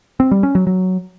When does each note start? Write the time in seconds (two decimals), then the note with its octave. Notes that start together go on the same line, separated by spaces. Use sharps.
0.20 C4
0.31 G3
0.43 C#4
0.55 F#3
0.67 F#3